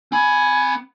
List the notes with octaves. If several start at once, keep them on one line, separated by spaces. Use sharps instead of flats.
C4 G#5 B5